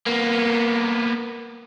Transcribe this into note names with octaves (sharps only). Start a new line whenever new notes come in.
A#3 B3